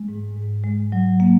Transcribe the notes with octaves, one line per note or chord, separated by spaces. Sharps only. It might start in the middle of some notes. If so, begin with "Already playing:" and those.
Already playing: G#3
G#2
G#2
G#3
F#3
A#3